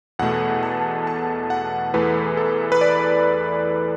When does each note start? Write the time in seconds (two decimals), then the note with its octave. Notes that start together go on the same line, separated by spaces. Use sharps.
0.19 E2 B2 A3 F#5
0.63 A5
1.07 A5
1.50 F#5
1.94 E2 E3 A3 B4
2.37 A4
2.72 B4
2.81 D5